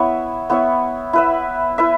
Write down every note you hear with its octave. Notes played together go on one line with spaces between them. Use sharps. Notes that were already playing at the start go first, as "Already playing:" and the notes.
Already playing: B3 E4 C#5 E5
B3 E4 C#5 E5
E4 B4 E5
E4 B4 E5